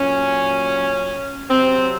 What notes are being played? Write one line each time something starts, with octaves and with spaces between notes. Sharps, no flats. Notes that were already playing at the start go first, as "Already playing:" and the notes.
Already playing: A#2 F#3 C#4
C3 F#3 C4